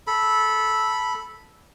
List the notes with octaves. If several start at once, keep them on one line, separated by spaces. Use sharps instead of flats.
A4 B5